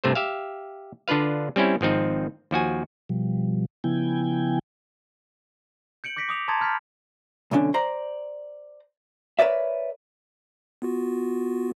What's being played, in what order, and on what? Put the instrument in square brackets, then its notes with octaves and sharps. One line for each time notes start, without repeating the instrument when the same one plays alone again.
[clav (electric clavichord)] G2 C3 A3 C5
G4 E5 F5
D3 D4 F4 B4 F5
G3 C4 C#4 E4
G#1 F3 C4 D#4
D#2 F3 F#4 G#5
[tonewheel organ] B2 F3 G3
C#3 F3 B3 E4 G5 G#5
[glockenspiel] G6 C#7 D7 F#7
D6 G6 A#6 B6 C#7 D7
D6 D#6 F7
A5 A#5 C6 D#6 G#6 A6
B5 F6 G6 A6 B6
[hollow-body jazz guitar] B1 E2 D3 C#4 D4
C5 D5 A#5
A#4 B4 C#5 D5 E5
[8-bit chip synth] B3 F4 F#4